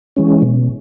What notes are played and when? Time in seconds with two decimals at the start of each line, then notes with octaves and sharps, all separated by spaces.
0.16 E3 G#3 C#4
0.42 B2